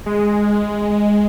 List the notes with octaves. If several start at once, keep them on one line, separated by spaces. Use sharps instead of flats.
G#3